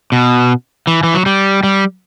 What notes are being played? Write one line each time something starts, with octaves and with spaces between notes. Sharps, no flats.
B2
E3
E3
F#3
G3
G3